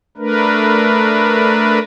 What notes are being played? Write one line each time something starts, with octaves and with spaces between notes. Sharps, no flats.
A3 D4 A#4 B4